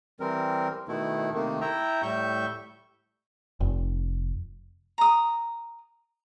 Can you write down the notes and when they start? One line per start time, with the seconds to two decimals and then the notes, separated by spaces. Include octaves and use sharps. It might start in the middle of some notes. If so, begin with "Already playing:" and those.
0.20 E3 G3 C4 A#4
0.88 B2 D#3 A3 E4
1.34 C3 D#3 A3 A#3
1.61 E4 E5 G5 A#5
2.02 A2 G3 E5 C#6 G6
3.61 F1
4.98 A#5 D#6